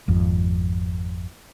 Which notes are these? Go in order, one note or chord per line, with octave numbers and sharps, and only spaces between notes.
G#1 F2